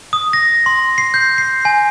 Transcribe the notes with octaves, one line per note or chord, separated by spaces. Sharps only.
D#6
A#6
C6
C7
G6
C7
G#5